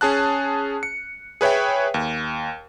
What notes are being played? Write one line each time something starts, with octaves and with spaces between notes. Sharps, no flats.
C#4 G#4 A5 F#6
C#7
G#4 B4 C#5 E5 G5
D#2